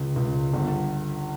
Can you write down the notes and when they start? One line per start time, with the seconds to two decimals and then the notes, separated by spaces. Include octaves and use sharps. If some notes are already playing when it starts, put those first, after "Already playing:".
Already playing: C#2
0.16 C#2
0.54 G1